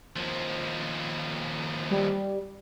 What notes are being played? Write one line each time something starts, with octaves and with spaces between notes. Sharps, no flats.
D#2 F3
G3